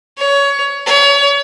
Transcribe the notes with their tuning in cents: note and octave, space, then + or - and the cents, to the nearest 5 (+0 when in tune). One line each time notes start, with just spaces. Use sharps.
C#5 +20
C#5 +35